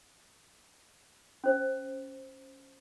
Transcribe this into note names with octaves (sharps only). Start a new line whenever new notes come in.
C#4 C5